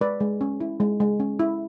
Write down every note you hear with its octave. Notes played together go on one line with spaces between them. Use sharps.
G#3 B4 D5
G#3
C#4
E4
G#3
G#3
C#4
E4